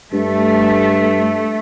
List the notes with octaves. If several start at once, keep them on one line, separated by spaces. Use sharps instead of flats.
G2 A3